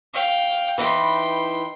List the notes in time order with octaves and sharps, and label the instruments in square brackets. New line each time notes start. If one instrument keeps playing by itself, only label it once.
[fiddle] F5 G5
[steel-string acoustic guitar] E3 D#4 B4 [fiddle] G5 C6